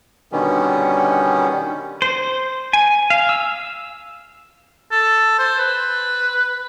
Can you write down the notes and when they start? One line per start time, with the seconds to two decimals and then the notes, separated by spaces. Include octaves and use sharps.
0.32 B2 D3 D#3 G3 B3 C#4
2.02 C5
2.73 G#5
3.10 F5
3.29 E6
4.91 A4
5.39 C5
5.58 B4